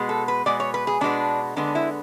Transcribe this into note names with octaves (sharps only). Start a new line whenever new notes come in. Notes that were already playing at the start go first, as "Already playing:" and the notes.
Already playing: B2 G#3 B3
A4
B4
B2 G#3 B3 D5
C#5
B4
G#4
B2 G#3 B3 D4
D3 G#3 B3 D4
E4